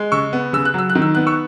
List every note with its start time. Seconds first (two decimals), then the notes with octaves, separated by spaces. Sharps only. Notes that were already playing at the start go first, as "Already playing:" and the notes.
Already playing: G#3
0.12 C#3 C#6 E6
0.33 B3
0.53 C#3 E6
0.65 F#6
0.74 F#3 E6
0.90 F#6
0.95 D#3
1.02 E6
1.15 B3 F#6
1.27 C#6 E6